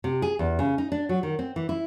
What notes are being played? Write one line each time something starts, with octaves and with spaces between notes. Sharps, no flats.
C3
G#4
E2
C#3
D#4
D4
F#3
D#3
C4
E3
E4